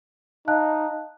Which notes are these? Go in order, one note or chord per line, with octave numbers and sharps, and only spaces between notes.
D#4 F5 A5 F#6